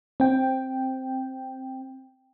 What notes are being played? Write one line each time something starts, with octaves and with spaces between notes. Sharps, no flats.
C4 G5